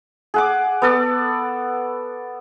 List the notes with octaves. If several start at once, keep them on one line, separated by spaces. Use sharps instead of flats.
G#4 F#5 D6
B3 A4 D5